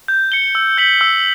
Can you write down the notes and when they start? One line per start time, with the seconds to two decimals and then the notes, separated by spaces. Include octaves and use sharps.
0.08 G6
0.32 C#7 G7
0.55 E6
0.78 G6 B6 F#7
1.01 E6